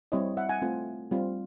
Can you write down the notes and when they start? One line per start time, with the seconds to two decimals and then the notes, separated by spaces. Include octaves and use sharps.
0.12 G3 C4 E4 C#5 D#5
0.37 E5 F#5
0.49 F#5 G#5
0.62 A3 C4 F4
1.11 G3 C4 F4